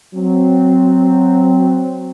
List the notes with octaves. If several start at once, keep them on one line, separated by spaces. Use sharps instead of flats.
F#3 C4